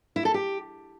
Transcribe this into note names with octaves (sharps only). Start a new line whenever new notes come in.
E4
A4
G4